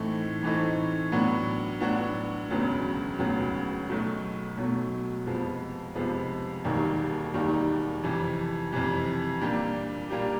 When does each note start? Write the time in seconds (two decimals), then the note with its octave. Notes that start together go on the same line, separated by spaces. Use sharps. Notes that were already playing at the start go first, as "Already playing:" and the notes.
Already playing: A2 E3 A3 C4 D#4
0.43 A2 E3 A3 C4 D#4
1.12 A2 F#3 B3 D4 F#4
1.80 A2 F#3 B3 D4 F#4
2.50 E1 D2 C#3 F#3 B3
3.19 E1 D2 C#3 F#3 B3
3.89 B1 B2 F#3 A3
4.57 B1 B2 F#3 A3
5.26 F2 C3 F3 G#3 B3
5.95 F2 C3 F3 G#3 B3
6.64 E1 D#2 D#3 G3 A#3
7.34 E1 D#2 D#3 G3 A#3
8.03 F2 C3 E3
8.72 F2 C3 E3
9.41 A#2 G3 A#3 D4 G4
10.10 A#2 G3 A#3 D4 G4